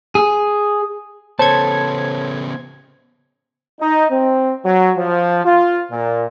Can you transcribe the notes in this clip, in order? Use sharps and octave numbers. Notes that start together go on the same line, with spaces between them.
G#4
C#3 B3 A4 C5 C#5 A5 G#6
D#4
C4
F#3
F3
F4
A#2